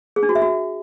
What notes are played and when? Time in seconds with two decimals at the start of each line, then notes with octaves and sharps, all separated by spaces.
0.16 G#4
0.23 D4
0.29 F#4
0.35 E5
0.42 F#4